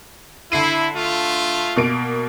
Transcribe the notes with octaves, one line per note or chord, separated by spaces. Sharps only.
D3 E4 C7 D#7
A3 F4
B2 A#3 D7